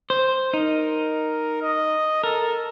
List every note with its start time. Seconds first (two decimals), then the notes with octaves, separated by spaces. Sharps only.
0.10 C5
0.54 D#4 A#4
1.62 D#5
2.24 A4 A#4